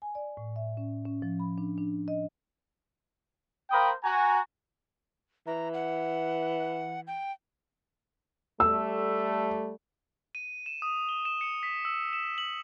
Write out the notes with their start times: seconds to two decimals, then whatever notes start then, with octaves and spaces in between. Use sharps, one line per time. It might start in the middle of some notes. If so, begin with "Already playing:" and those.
0.02 G#5
0.15 D5
0.37 A2
0.56 E5
0.77 C#4
1.05 C#4
1.22 F3
1.40 B5
1.58 D4
1.78 D4
2.08 D#5
3.70 A#3 A#4 C5 G5 B5 D#6
4.04 F#4 G#5 A#5
5.47 E3 A#5
5.74 F#5
7.07 G5
8.60 G3 A3 E6
10.35 D#7
10.66 E7
10.82 D#6
11.09 G7
11.25 E7
11.41 C#7
11.63 B6
11.85 E6
12.13 E7
12.38 F#7